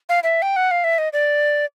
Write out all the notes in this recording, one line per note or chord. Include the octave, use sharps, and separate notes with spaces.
F5
E5
G5
F#5
F5
E5
D#5
D5